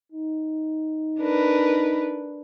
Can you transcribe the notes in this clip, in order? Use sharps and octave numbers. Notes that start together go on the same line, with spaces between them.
D#4
D4 A#4 B4